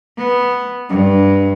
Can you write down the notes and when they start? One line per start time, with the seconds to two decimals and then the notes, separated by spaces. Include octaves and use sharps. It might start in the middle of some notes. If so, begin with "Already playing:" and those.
0.20 B3
0.90 G2